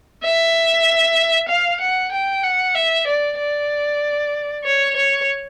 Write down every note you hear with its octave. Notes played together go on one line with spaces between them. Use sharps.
E5
F5
F#5
G5
F#5
E5
D5
D5
C#5
C#5